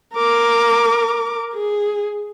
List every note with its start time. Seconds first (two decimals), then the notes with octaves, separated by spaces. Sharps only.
0.15 A#4 D6
1.54 G#4